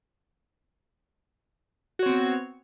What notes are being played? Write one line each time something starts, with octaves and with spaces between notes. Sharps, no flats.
B3 C4 F#4 C#5